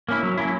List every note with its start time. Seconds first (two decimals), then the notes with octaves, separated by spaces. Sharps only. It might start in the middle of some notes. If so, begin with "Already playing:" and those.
0.09 A#3 C#4 E4
0.23 F#3
0.37 A#3 C#4 E4